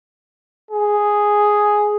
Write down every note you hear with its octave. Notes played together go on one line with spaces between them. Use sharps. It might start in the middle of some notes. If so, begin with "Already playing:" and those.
G#4